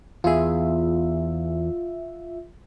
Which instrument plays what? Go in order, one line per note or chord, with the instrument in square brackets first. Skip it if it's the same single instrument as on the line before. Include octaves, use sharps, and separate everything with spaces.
[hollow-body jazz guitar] E2 G#4 [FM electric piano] F4 E5